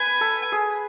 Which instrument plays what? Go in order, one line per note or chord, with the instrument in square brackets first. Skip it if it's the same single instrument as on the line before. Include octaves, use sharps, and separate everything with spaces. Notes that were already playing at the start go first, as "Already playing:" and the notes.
Already playing: [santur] B4 [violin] G#5
[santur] A4
G#4